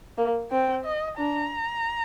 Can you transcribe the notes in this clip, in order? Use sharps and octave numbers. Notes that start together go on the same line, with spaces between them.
A#3
C4 G5
D#5
D4 A#5